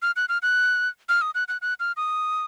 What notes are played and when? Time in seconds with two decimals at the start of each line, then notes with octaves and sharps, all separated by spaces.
0.02 F6
0.16 F#6
0.29 F6
0.42 F#6
1.09 F6
1.22 D#6
1.35 F#6
1.48 F#6
1.62 F#6
1.80 F6
1.97 D#6